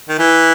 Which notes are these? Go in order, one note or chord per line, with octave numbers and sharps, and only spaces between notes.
D#3
E3